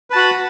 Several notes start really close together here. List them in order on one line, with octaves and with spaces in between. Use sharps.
B4 A5 F#4 B5